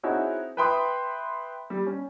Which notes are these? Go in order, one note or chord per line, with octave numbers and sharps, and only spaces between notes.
C4 D#4 E4 F#4 G#4 C#5
B4 E5 G5 B5 C6 D#6
G3
C#4